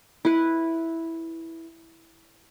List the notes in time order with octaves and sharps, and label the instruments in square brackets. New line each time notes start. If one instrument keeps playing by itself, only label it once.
[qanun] E4 B4